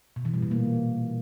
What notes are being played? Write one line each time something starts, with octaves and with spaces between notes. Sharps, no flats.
B2
E3
G3
A#2
A#3